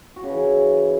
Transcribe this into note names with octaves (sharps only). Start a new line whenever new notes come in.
F#4
C#3
E3
E4